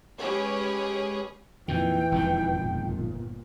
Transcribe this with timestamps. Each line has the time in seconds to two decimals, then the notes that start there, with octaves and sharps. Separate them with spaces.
0.18 G#3 C#4 G4 G#4 B4 C#5
1.68 F2 A#2 D#3 E3 G5
2.12 E1 F2 D#3
2.54 G1 A#2